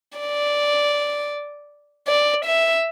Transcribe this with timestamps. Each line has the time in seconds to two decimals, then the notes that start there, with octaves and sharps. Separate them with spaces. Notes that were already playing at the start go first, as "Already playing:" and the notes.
0.18 D5
2.07 D5
2.45 E5